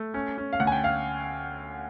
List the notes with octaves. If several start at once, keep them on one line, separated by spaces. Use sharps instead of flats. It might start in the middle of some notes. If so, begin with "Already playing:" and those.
Already playing: A3
C#4
C#4
F5
D2 F#5
G#5
G5
F5